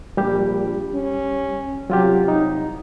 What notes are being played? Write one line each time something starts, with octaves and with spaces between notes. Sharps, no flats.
A#1 G3 G4
C#4
C2 F#3 F4 G4
D#4